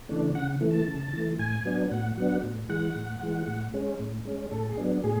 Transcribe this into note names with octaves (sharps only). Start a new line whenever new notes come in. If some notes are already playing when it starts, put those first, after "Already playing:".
C#3 E3 A3 D4
C#3 F#5
E3 A3
A5
C#3
E3 A3
A2 G#5
F#3 B3 D4
A2 F#5
F#3 B3 D4 F#5
A2
E3 G#3 F#5
A2
E3 G#3
A2
G#3 C#4
A2
G#3 C#4
A2 A4
G#4
F#3 B3 D4
A2 G#4